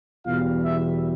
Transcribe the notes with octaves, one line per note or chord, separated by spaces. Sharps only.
E2 B2 G3 F4 F5
E4 E5